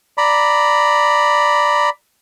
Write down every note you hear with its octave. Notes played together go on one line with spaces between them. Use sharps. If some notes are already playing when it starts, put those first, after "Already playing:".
D5 A#5 B5